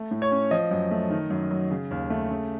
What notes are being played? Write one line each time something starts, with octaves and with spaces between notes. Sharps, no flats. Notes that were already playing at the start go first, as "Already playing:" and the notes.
Already playing: A3
A2
C#5
C#4
F3 D#5
F#2
A3
D#3
F#2
F#3
C#3
D#2
A3
C#3